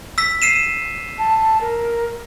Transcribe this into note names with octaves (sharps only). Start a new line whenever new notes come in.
E6 B6
C7 D#7 E7
A5
A#4